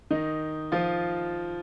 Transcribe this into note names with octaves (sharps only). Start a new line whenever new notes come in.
D#3 D#4
F3 F4